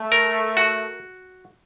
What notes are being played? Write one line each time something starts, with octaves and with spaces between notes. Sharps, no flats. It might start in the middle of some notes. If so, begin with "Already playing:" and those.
Already playing: A3
A#4
F#4